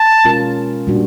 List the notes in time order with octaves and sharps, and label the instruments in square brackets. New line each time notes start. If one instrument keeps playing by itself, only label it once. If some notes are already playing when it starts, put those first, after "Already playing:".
Already playing: [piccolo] A5
[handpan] B2 G#3 C#4 F4 A#4
A#2 G3 A#3 D4 F#4